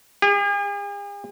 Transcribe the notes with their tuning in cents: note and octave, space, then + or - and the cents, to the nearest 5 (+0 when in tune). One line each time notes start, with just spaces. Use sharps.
G#4 -45